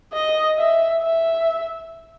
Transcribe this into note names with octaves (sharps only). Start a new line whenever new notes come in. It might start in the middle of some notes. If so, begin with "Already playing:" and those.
D#5
E5
E5